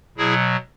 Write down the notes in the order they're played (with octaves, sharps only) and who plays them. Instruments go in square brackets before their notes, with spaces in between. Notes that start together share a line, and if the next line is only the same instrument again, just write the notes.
[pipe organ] B2 F#3 E4 G#4